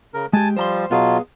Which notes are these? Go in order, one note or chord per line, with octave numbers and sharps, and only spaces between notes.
C#3 A#4
G#3 G4 G#5 A5
F3 G3 C5 A#5 C6
B2 F#3 B3 F4 G#4 F5